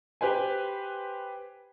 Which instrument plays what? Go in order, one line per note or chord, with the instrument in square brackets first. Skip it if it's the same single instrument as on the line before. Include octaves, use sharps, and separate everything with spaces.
[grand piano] G4 B4 C5 G#5